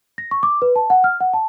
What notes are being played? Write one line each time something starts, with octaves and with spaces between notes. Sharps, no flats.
A#6
C#6
D6
B4
A5
F#5
F6
F#5
A5